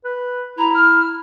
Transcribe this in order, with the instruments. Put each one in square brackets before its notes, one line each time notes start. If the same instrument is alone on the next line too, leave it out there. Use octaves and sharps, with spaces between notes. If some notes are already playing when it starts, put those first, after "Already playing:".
[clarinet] B4
[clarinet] E4 [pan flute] A#5
[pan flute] F6